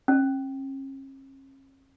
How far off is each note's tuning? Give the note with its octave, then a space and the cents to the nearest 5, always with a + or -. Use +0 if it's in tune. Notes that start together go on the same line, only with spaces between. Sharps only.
C#4 -45